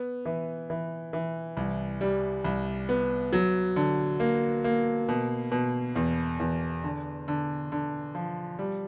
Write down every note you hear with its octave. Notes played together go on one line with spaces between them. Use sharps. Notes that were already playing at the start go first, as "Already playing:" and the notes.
Already playing: B3
E3
E3
E3
C2
G3
C2
B3
F#3
D3
A#3
A#3
B2
B2
E2
E2
D3
D3
D3
F3
G3